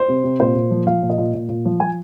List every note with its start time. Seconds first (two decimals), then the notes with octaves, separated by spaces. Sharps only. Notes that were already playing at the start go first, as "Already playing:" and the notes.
Already playing: C5
0.08 C3
0.24 C3
0.40 A#2 C5
0.55 A#2
0.71 F3
0.87 F3 F5
1.02 A#2
1.10 D#5
1.18 A#2
1.34 A#2
1.49 A#2
1.65 F3
1.80 F3 G#5